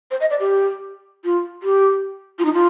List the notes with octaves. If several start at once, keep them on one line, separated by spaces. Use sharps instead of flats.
C5
D#5
D5
G4
F4
G4
F4
D#4
F4